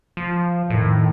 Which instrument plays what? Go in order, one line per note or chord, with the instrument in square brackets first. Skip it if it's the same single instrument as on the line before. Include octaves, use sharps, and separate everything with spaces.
[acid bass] F3
[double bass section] F2 D#3 [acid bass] A2